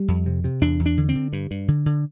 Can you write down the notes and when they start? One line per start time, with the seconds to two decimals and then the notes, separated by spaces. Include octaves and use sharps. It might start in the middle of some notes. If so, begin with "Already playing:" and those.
Already playing: G3
0.08 F2
0.26 C3
0.44 C3
0.61 E2 D4
0.80 E2
0.86 D4
0.97 D3
1.09 C4
1.15 D3
1.33 G2
1.51 G2
1.68 D3
1.86 D3